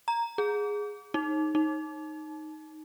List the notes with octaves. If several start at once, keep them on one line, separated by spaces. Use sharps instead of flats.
A#5
G#4
D#4
D#4